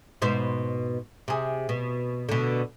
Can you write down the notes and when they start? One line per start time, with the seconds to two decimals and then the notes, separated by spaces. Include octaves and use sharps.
0.22 G#2 B2 C5
1.28 C3 G#4
1.69 B2
2.29 B2 D3